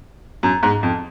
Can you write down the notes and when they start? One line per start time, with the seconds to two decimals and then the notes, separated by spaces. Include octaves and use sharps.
0.43 F#2
0.63 G#2
0.83 F2